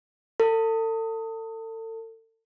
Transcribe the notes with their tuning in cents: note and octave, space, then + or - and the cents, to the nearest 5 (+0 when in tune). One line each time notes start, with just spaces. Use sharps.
A4 +35